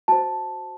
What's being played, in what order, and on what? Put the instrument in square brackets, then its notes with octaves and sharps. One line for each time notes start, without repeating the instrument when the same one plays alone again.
[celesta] F#4 C5 A5